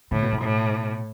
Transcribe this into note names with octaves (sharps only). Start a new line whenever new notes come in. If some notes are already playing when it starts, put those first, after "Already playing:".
A2 D3
B2
B2
A2